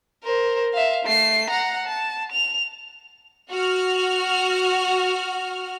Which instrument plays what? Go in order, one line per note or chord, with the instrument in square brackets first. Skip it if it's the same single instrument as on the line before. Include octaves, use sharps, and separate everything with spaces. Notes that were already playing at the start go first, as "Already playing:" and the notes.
[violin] A#4 C5
E5 F5
A3 C7
F#5 A#5
A5
F7
[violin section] F#4 F6